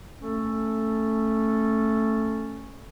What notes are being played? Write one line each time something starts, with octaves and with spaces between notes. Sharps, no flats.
A3 C#4 A4